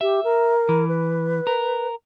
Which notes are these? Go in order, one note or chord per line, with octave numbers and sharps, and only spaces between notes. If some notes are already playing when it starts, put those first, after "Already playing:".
G4 E5
A#4
E3
B4
A#4